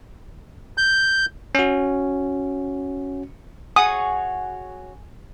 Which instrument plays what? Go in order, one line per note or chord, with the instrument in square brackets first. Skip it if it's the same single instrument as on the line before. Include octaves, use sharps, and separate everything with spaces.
[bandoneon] G6
[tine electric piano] C#4 F#4
[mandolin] F#4 G#4 C#5 [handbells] G#5 [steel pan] D#6